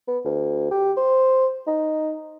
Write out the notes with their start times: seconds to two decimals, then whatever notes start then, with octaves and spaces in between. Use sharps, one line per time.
0.08 B3
0.25 D2
0.71 G4
0.97 C5
1.67 D#4